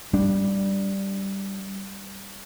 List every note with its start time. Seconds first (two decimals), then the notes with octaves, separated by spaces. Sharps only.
0.13 G3 D4